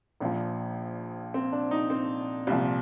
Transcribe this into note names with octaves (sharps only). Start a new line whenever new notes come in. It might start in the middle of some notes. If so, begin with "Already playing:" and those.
A#1 A#2 F3
C4
D4
D#4
C4
C2 A#2 F3